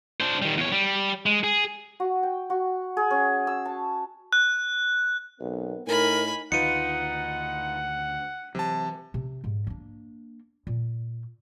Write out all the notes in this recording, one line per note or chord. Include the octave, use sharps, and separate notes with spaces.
D4 C5
D#3 G3
E2 C#5
G3
G#3
G#4
F#4
G5
F#4
G#4
C#4
E6
A5
F#6
B1 B3 C4 A#4
A2 D#4 A#4 G#5 B5
D2 D#3 D#4 F4 B4 F#5 C#7 D#7
C3 E3 F#3 A5
C3
G#2
A#3 D4
A#2